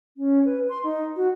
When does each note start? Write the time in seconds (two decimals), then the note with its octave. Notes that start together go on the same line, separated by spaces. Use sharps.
0.17 C#4
0.45 B4
0.69 C6
0.84 D#4
1.16 F#4